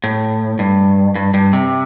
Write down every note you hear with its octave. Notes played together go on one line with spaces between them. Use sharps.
A2
G2
G2
G2
C3